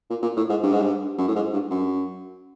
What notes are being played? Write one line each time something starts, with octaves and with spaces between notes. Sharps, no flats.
A#2
A#2
A2
G#2
G2
G#2
G2
F#2
A2
G#2
G2
F#2